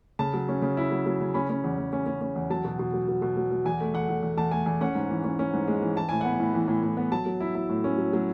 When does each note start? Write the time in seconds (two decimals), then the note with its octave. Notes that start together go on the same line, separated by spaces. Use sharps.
0.19 C#3 A5
0.34 F#3
0.49 C#4
0.62 C#3
0.77 E4
0.92 F#3
1.06 F#3
1.20 C#3
1.34 C#4 B5
1.50 C#4
1.64 E2
1.78 E2
1.93 C#4
2.06 C#4
2.21 C#4
2.36 E2
2.50 F#3 A5
2.65 B2
2.79 B2
2.94 F#3
3.08 B2
3.22 B2
3.37 F#3
3.52 F#3
3.65 E2 G#5
3.81 A3
3.94 E2 F#5
4.09 E2
4.23 E2
4.38 E2 A5
4.51 A3 G#5
4.66 E2 G#5
4.81 C#4 F#5
4.95 G#2
5.10 E3
5.24 C#4
5.39 C#4
5.54 G#2
5.68 G#3
5.82 E3
5.96 E3 A5
6.09 A2 G#5
6.21 B3 F#5
6.33 G#5
6.40 A2
6.54 E3
6.68 A2
6.83 A2
6.97 B3
7.11 F#3 A5
7.26 F#3
7.40 E4
7.55 E4
7.69 A2
7.84 C#4
7.98 F#3
8.13 F#3